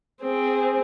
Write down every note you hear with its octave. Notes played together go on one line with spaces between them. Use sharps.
C4 G#4